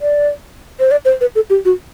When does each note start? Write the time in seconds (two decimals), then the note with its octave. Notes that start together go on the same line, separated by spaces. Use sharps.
0.01 D5
0.80 C5
0.91 D5
1.05 C5
1.21 B4
1.35 A4
1.50 G4
1.65 F#4